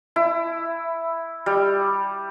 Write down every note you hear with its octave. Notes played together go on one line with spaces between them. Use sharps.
E4
G3